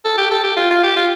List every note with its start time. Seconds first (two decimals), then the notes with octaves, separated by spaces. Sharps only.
0.05 A4
0.18 G4
0.31 A4
0.44 G4
0.57 F4
0.70 F4
0.84 G4
0.96 F4